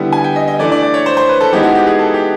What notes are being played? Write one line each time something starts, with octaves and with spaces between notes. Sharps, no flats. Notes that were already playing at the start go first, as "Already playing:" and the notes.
Already playing: D3 G3 B3 E4
G#5
G5
D#5
D#5
E3 A3 D4 D5
D5
D5
C#5
C5
C5
B4
A4
E3 G#3 B3 D#4 G4
F#4
G4
G#4
A4
G4